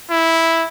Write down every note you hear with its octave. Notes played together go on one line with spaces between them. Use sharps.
E4